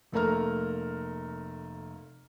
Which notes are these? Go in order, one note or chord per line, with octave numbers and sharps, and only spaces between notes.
F1 A3 A#3 A#5 F6